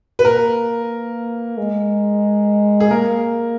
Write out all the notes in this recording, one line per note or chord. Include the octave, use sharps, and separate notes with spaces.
B4
A#3 A#4
G#3
G#4
A#3 A#4